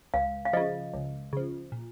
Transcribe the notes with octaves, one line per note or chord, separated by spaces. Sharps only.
C#2 F5
F5
C#3 F3 D#5
C#2
C#3 F3
A#2